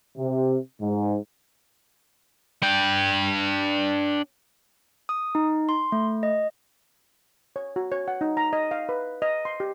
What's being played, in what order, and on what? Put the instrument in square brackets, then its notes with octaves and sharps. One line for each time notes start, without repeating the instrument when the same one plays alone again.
[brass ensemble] C3
G#2
[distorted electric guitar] D4 G5
[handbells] D#6
D#4
C6
A3
D#5
[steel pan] C#5
F#4
C#5
F#5
D#4
A#5
D#5
F5
B4
D#5
C6
G4